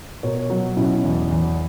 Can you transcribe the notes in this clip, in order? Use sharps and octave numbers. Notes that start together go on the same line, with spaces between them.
B2 A#4 C#5
F#3
B2 C#4 E4
E2
E2